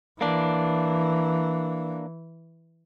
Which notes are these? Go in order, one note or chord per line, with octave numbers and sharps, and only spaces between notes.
E3 A#3 D4